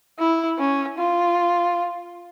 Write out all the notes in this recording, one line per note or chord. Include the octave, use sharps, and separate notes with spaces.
E4
C#4
F4